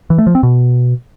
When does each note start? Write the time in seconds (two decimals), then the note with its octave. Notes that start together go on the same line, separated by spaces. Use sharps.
0.10 E3
0.18 A3
0.27 F3
0.35 C4
0.43 B2